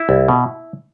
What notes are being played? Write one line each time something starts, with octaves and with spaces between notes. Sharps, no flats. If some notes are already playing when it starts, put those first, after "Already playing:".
Already playing: E4
C2
B2